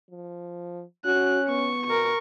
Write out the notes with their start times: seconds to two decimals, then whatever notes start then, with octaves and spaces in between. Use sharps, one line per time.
0.10 F3
1.06 C#4 F#4 F#6
1.49 B3 C#6
1.87 B2 A#4 C#6